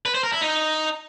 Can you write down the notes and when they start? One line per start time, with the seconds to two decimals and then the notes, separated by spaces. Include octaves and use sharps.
0.06 B4
0.15 C5
0.24 A#4
0.32 E4
0.41 D#4